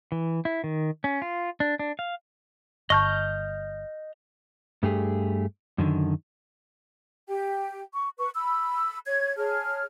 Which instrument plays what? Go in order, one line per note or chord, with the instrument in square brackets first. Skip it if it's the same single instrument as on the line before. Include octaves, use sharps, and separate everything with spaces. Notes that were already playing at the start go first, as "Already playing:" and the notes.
[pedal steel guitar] E3
E4
D#3
C#4
F4
D4
D4
F5
[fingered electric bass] G1 [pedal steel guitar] D#5 F6 G6 [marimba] A5 C#6
[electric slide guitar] G2 A3 G4 G#4
F#2 D3 D#3
[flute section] G4 G5
C#6
B4 C#6
B5 E6
C#5 G#6
G#4 C#5 A5 F6